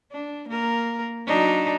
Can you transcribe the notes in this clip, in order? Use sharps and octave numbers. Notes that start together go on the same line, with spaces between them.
D4
A#3 A#4
F#3 D4 D#4